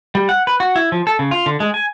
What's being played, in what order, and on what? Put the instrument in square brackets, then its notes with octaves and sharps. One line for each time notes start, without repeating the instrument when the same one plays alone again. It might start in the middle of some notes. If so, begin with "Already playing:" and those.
[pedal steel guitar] G3
F#5
B4
F#4
E4
F3
A4
C#3
F4
D3
G#3
G#5